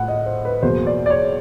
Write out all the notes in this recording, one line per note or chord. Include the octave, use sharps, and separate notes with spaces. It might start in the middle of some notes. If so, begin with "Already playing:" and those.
Already playing: A2 F#5
D#5
C5
B4
E2 B2 F#3 A#3 C5
D5
D5
C#5